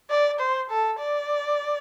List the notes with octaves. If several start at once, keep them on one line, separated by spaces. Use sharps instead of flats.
D5
C5
A4
D5